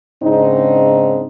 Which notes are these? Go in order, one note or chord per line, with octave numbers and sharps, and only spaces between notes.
G#2 C#3 C4 D4 D#4